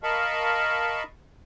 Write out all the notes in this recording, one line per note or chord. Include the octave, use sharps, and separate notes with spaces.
A#4 D#5 F5 A5 B5 C#6